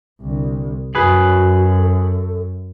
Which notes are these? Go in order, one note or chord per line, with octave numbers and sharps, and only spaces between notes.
C2 D3
F#2 F#4 G#4 B4
A4